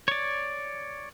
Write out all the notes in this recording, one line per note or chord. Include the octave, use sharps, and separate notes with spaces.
C#5 D5